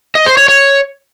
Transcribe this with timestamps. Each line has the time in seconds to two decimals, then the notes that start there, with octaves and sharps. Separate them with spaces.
0.15 D#5
0.26 C5
0.37 C#5
0.48 C#5